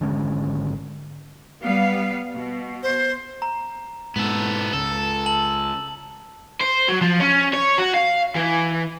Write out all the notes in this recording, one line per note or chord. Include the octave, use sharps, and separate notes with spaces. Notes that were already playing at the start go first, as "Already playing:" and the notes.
G#1 D3 G#3 C#4
G3 B3 F5
B2
C5
A#5
G#2 B2 B3 A4
C#2 A4
A5 F#7
C5
F#3
F3
C#4
C#5
F#4
F5
E3